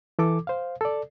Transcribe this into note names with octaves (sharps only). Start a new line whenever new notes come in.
E3 A4 D6
C5 F5
A4 D5